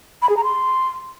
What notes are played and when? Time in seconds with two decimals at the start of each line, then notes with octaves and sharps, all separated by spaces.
0.22 B5
0.29 G#4
0.37 A#5
0.44 C6